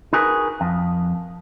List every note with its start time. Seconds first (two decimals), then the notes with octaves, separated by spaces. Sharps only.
0.13 D#4 F#4 G#4 A#4 B4
0.61 F2